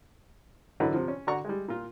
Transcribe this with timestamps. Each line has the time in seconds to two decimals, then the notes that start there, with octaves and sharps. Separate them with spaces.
0.80 F#2 D3 E3 F#3 B4 D#5
0.94 C3 F3
1.08 C#4
1.27 D3 F#4 D5 A#5 C#6
1.45 G3 G#3
1.68 A#2 F4